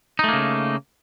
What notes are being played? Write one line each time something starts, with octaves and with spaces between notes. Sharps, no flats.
C#3 A3 A#3 D#4